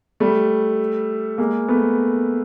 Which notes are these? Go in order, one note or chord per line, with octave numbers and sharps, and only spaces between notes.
G3 A3
G#3 A#3
A3 B3